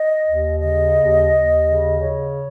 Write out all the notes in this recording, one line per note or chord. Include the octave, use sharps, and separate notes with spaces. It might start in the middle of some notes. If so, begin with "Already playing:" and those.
Already playing: D#5
D#2
C#3 D#5
D#2
D#2
C#3
C#3 C#5